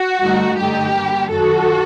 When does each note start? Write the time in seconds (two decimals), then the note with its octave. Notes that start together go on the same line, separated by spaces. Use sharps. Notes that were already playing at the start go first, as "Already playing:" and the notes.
Already playing: F#4
0.21 G2 D3 A3 D#4
0.57 G2 D3 A3 D#4 G4
0.93 D3 G3 A#3
1.30 F#2 D#3 F#3 F#4 A4